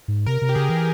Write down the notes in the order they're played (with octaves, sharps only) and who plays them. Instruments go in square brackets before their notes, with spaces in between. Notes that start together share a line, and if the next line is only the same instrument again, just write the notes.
[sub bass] G#2
[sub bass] C3 [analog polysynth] A#4
[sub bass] C3
[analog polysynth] G4
[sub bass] C#3 [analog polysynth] G#4
[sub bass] E3